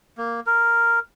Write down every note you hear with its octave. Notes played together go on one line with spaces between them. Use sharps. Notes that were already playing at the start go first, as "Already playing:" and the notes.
A#3
A#4